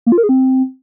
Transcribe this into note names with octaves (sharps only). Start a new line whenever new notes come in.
A#3
F4
A#4
G#4
C4